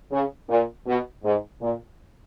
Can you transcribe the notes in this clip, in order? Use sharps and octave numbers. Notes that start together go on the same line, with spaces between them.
C#3
A#2
B2
G#2
A#2